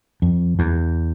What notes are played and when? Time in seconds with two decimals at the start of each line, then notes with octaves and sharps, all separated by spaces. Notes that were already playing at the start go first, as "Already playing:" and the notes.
0.22 F2
0.59 E2